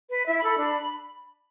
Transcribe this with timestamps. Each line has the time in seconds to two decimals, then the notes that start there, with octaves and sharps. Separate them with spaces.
0.09 B4
0.26 E4 E5
0.37 B5
0.43 A4
0.48 B5
0.59 D4